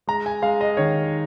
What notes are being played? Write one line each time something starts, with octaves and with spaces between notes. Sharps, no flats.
G#3 A#5
G#5
G#3 F5
D#5
D#3 C#5